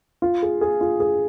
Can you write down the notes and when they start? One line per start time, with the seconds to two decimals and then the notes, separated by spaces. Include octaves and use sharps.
0.22 F4
0.42 G#4
0.61 G#4
0.81 F4
1.00 G#4